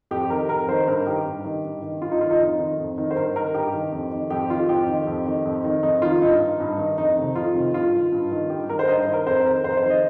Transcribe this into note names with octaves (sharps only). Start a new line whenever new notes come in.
F2 G4
D#3 A#4
F2 A#4
D#3 C5
G2 A#4
D#3 G4
G2
D#3
G2
D#3
G2 F4
D#4
D#3 F4
D#4
F2
D#3
F2
D#3
C5
G2 A#4
D#3 A#4
G2 G4
D#3
F2
D#3
F2 G4
D#3 F4
F2 G4
D#3
F2
D#3
F2
D#3
F2 D#4
D#3 F4
G2 D#4
D#3
G2
D#3
F2 D#4
C3 D#3
F2 F4
C3 D#3
G2 F4
D#3
G2
D#3
G2 G4
D#3 A#4
C5
G2 D#5
C5
D#3
A#4
F2 C5
D#3 A#4
F2 C5
C5
D#3
D#5